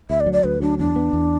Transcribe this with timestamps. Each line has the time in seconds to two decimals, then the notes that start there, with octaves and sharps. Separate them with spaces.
0.10 D2 E5
0.20 D5
0.26 F#3
0.33 D5
0.44 D2 B4
0.62 F#3 D4
0.79 E2 D4
0.96 B3
1.13 E2